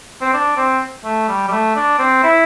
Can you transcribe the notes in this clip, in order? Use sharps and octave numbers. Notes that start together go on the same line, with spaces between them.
C4
D4
C4
A3
G3
G3
A3
D4
C4
E4